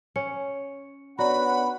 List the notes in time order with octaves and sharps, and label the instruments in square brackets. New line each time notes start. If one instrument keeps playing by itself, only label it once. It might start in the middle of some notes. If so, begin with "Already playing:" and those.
[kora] C#4 [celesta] C#7
[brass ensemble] B3 D4 F#5 [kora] F#4 [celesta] C#5 D5 A#5 [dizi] B5